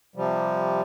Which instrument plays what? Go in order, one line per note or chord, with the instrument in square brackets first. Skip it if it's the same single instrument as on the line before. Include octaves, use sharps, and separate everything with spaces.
[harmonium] C3 F3 G3